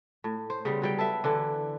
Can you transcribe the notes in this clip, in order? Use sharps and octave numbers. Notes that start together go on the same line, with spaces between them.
A2
C5
C#3 G3 B3
F#3 G3 G5
A4 B4 E5
D3 E3 A4